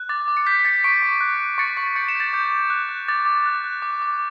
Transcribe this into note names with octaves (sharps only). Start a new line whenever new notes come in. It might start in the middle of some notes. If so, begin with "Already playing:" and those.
Already playing: F#6
D6 A6
D6
C#7
G6 B6
B6
G6 A6 C#7
C#6 B6 D7
C#6
F#6
F#6
C#6 A6 C#7
C#6 A6
G6 A6 C#7
C#7 E7
G6
A6
D6 G6
D6
F#6
F#6
D6 A6
D6
F#6
F#6
D6
D6